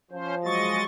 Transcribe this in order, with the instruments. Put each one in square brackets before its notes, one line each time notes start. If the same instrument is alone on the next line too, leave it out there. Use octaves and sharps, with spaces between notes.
[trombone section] F3 [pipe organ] C#4 C5
[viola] F#3 C#6 [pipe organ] G#3 D#5 A6